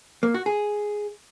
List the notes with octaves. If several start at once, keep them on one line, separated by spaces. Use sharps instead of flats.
A#3
F#4
G#4